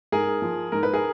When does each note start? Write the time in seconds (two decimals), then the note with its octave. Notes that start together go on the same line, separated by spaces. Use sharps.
0.12 G#2 G#4 A#4
0.42 F3
0.72 G#2 A#4
0.83 B4
0.93 G#4 A#4